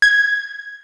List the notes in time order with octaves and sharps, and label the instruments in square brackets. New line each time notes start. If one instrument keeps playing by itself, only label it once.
[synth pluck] G#6